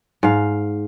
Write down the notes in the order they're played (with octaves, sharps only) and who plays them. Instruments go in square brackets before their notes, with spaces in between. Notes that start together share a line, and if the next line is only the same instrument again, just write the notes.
[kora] G#2 F5